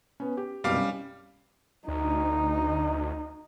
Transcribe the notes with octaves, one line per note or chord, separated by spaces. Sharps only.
B3 C#4
G4
F#1 C2 B2 G3 F5 D6
C#4
D2 D#4